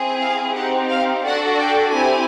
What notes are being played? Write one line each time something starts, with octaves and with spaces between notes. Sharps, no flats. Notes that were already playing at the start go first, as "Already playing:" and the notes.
Already playing: C4 E4 G#4
F5
C4 D#4 G4 F#5
F5
D4 F#4 A4 F#5
G5
C4 E4 G4 G#5